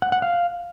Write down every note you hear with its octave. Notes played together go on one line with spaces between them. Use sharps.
F#5
F#5
F5